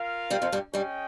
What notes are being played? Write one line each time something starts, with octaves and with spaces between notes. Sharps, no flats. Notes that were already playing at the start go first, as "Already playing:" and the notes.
Already playing: F4 A#4 F5
G2 G3
F2 F3
G2 G3
G2 G3 C#4 G#4 D#5 G5